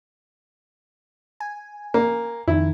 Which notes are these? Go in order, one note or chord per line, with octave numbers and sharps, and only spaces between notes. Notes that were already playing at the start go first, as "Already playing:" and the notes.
G#5
A#3
F2 D#3 E4